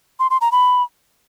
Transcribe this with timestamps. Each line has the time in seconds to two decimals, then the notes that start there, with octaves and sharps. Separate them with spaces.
0.20 C6
0.30 C6
0.41 A#5
0.52 B5